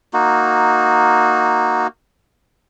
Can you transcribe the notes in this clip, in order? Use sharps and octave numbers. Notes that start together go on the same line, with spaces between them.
A#3 D#4 F#4